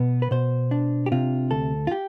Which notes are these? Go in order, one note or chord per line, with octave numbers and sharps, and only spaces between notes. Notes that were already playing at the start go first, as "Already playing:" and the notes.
Already playing: B2 B3
B4
B2 C5
D4
G4
C3 F4
D2 A4
F4
G4